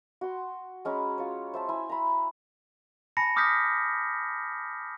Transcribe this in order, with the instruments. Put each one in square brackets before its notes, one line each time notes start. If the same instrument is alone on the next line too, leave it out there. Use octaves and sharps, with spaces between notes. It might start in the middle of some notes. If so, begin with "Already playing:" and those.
[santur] F#4 C6
G#3 C#4 A#5 B5
F4 C#5
C5 E5 A5
E4 G#5
A#5 B5
[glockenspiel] G#5 A5 B5 A#6 C#7
D6 D#6 F6 G6 A#6 B6